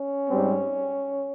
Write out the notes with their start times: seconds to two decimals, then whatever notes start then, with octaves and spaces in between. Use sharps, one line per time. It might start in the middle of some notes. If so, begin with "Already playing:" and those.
Already playing: C#4
0.29 G#2 G3 C4